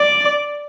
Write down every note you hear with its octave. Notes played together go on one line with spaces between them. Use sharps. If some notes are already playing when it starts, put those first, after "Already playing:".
Already playing: D5